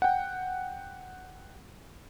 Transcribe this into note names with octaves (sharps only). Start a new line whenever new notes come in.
F#5 G5